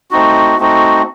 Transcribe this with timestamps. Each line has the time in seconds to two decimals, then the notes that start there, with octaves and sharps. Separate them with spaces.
0.11 A3 C4 D#4 F#4
0.59 A3 C4 D#4 F#4